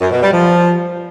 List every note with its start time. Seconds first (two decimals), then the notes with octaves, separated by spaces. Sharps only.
0.01 F#2
0.12 B2
0.23 G3
0.33 F3